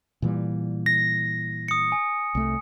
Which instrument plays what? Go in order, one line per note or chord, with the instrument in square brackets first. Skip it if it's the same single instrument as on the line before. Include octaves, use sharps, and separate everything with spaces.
[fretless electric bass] A#2 E3 G3
[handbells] A#6
[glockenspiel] D#6 C#7
G#5
[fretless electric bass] C2 A3